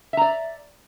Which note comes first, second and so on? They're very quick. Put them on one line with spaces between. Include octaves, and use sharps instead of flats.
E5 A#5 D5